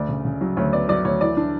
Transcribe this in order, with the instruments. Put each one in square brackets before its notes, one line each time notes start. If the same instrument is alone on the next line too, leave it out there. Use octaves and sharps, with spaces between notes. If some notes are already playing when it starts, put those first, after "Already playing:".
Already playing: [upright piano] D2 D5
C#3
C#3
F#3
D2 C#5
B3 D5
F#3 D5
D2 C#5
E3 D5
D4